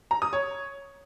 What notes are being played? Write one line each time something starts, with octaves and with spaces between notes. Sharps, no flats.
A#5
D#6
C#5